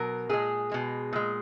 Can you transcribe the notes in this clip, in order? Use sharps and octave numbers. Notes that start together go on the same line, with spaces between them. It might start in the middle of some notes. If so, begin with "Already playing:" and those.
Already playing: B2 F#3 A#4
A#2 G#3 G#4
B2 G#3
A#2 G#3